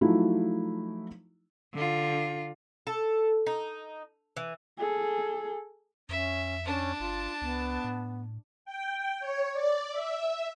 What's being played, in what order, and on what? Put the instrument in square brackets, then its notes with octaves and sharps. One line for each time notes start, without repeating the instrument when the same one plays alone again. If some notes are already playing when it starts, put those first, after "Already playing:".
[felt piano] F3 F#3 A3 D#4 E4 F#4
[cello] D3 F4
[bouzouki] A4
D#4
E3
[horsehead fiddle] G#4 A4
[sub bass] F2 [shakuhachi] C#4 [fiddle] E5
[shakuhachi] C#4 [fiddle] D4 A5
[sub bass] G1 [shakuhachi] F4
[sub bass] C#2 [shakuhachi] B3
[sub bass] A2
[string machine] G5
C#5
D5
E5